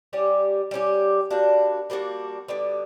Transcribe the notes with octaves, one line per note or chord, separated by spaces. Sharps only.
G3 C#4 G4
G3 C#4 G4
G3 A#3 D4 F#4
G3 A#3 D4 F#4
D3 G3 B3